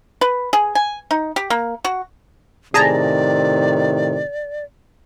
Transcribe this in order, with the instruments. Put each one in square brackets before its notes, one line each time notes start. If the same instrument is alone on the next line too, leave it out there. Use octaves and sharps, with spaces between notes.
[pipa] B4
G#4
G#5
D#4
G4
A#3
F#4
[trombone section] A2 C3 D#3 [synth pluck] G#4 A5 A#5 [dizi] D5